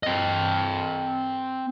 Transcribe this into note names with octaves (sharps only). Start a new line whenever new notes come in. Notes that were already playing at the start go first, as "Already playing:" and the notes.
C4 D#5